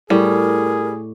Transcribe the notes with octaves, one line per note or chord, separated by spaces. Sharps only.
A2 G3 G#4 A#4